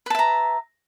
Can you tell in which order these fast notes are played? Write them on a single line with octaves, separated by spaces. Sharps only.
B4 A5 E5 A#5